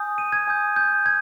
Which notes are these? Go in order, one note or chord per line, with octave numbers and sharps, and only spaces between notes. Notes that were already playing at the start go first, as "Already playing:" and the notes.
Already playing: G#5 D#6 G6
D#7
G#6
G#5 D#6 G6
G6
G#5 G#6